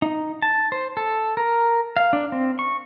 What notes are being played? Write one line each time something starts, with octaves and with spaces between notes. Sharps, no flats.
D#4
A5
C5
A4
A#4
F5
D4
C4
C#6